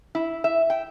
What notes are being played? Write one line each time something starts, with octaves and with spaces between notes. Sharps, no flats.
E4
E5
G5